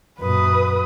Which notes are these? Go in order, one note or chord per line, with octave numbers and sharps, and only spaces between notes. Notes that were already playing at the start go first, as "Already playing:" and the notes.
F#2 A#2 B4 D#6